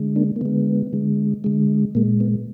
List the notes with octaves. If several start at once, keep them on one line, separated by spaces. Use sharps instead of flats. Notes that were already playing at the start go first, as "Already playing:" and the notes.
Already playing: D3 G#3
A#3 D4
A#3
D3 G#3 B3
D3 G#3
D3 G#3
A#2 G#3 A#3
B3